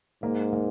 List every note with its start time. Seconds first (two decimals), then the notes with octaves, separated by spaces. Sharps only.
0.23 G#2 A#3
0.53 A#3